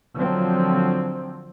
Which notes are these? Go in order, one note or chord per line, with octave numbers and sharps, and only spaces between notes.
D3 F3 F#3 C4